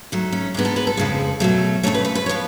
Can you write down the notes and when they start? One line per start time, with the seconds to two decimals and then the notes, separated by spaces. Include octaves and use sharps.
0.12 G#2 F#3 A3
0.32 C#4
0.54 G#2 D4
0.57 G#3 B3
0.65 A4
0.76 B4
0.87 A4
0.97 F2 C#3 F3 G#3
1.40 B2 F#3 A3
1.83 F2 C#3 F3 A3 C#5
1.94 B4
2.05 B4
2.15 B4
2.26 C#5
2.29 F3 B3